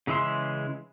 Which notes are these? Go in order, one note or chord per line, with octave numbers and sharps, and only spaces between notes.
C#3 E3 G#3 E5 C6